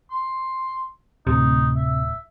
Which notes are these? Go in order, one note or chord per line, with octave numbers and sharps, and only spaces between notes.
C6
D1 C3 D#4
E5